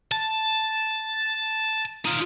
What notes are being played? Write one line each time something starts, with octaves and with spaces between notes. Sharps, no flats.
A5
D#4 F4